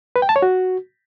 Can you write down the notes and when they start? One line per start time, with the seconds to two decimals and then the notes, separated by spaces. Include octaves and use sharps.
0.16 B4
0.22 G5
0.29 A5
0.36 C#5
0.42 F#4